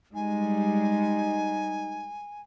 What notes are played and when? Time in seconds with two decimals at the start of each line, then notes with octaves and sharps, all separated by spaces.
0.15 G3 G#3 D#4 G#5